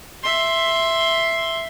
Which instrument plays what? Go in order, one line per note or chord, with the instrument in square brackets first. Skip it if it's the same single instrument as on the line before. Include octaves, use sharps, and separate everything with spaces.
[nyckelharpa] E5 C6